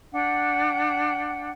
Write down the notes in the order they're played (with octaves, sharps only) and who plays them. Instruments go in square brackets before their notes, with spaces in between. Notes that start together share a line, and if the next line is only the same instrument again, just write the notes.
[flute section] D4 F#5 G5